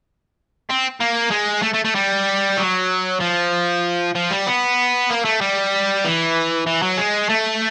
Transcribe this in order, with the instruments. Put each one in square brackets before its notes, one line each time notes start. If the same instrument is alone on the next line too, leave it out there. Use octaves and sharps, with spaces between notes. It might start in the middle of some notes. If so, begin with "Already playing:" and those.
[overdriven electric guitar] C4
A#3
G#3
A3
A3
A3
G3
F#3
F3
F3
G3
B3
A#3
A3
G3
E3
E3
F#3
G#3
A3